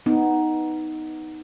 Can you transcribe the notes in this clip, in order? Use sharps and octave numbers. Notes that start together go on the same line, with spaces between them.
B3 D#4